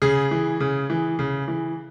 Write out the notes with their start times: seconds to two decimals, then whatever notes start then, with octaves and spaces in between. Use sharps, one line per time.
0.02 C#3 G#4
0.31 E3
0.61 C#3
0.90 E3
1.19 C#3
1.48 E3